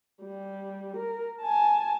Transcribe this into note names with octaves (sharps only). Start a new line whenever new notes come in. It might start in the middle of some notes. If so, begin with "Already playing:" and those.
G3
A#4
G#5 A5